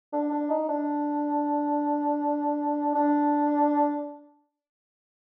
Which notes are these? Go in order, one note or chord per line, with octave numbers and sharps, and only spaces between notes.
D4
D4
D#4
D4
D4